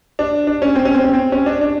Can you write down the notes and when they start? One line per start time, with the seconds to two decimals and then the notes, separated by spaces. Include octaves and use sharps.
0.19 D4
0.47 D4
0.62 C#4
0.76 C4
0.85 C#4
0.95 C4
1.04 C#4
1.13 C4
1.32 C#4
1.46 D4
1.61 D4